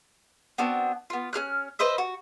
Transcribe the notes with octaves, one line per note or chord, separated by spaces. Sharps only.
B3 C4 D4 F#4
B3 F4
C#4 G#4 F6 F#6
B4 C5 D#5 E5
F#4